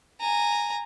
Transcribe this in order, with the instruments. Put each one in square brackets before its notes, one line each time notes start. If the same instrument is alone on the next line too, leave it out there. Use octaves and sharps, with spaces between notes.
[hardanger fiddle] G#5 A#5